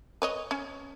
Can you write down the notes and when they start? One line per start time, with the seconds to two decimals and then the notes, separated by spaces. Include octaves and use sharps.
0.22 B4 C#5 D#5
0.51 C#4